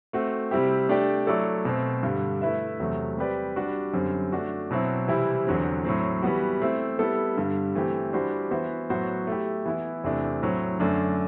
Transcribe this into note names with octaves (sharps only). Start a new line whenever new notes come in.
A3 C4 F#4
C3 G3 C4 E4 G4
A3 D4 G4 D5
F#3 A3 E4 A4 D5
B2 A3 C4
G2 D3 G3
A3 E4 B4 E5
E2 C3 F#3 A3
G3 C4 G4 B4 D5
G3 D4 F#4
F#2 D3 G3 C4
A3 D4 F#4
B2 F#3 C4 E4
C3 E3 G3 C4 E4
E2 D3 F#3 C4
A2 F#3 C4
E3 G3 B3 F#4
A3 C4 E4
G3 B3 E4 A4
G2 D3 G3
E3 A3 C4 G4
E3 G3 D4 F#4 C5
E3 B3 F#4 C5 E5
A2 F#3 B3 F#4 C5
A3 E4 G4
E3 B3 E4
E2 C3 E3 A3 D4
A2 F#3 C4
F#2 D3 A3 D4